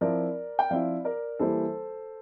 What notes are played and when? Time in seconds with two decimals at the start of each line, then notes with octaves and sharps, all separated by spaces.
0.01 F3 C4 E4 A#4 D5
0.59 G5
0.70 F3 C4 E4 D5 F5
1.04 A#4 D5
1.39 E3 G3 A#3 E4 A4 C5